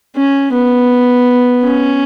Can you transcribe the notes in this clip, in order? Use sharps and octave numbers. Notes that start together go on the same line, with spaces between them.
C#4
B3
C#4